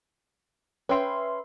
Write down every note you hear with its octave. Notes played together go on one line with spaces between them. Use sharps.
C#4 B4 E5 G5 C6